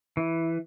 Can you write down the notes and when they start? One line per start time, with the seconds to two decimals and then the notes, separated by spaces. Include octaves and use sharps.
0.17 E3